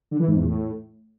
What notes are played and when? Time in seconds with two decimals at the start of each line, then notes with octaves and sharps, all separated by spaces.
0.11 D3
0.20 E3
0.28 G#2
0.36 E2
0.44 A2